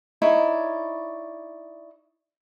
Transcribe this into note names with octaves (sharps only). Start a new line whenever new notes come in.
D#4 E4 C#5 D5